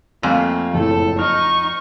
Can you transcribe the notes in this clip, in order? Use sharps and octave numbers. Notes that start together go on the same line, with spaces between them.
F2 A3 A#3 F5 G#5
F#1 A2 A4
D#4 C#6 F6